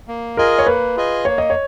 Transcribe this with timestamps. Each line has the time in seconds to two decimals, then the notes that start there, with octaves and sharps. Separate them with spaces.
0.08 A#3
0.37 F4 G#4 A#4 D#5 G#5
0.59 C#5
0.67 A#3 B4
0.97 F4 G#4 D#5 G#5
1.25 A#3 C#5
1.38 D#5
1.50 C#5